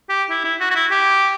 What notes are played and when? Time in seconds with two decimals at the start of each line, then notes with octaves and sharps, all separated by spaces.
0.09 G4
0.30 E4
0.45 E4
0.60 F#4
0.71 F#4
0.75 E4
0.91 G4